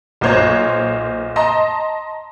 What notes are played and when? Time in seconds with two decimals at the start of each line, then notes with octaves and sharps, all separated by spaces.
0.21 B1 A#2 C5 C#5 F#6
1.36 D#5 A5 A#5 C6